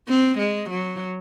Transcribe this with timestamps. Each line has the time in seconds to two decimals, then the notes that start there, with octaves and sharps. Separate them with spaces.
0.08 C4
0.38 G#3
0.70 F#3